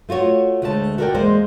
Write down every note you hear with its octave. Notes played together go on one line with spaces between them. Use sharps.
A3 F4 F#4 C#5
D2 G#3 A3 D5 A5
F#4 A4 A#4 C5 D5 G5
E2 G#3 A#3 A#4 C5